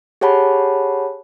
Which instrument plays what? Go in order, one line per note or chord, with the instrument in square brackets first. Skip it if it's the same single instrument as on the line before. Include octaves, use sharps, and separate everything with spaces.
[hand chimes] G4 G#4 C#5 F#5 A5 B5